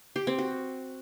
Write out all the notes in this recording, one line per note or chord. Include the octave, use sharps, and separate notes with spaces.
G4
C4
F#4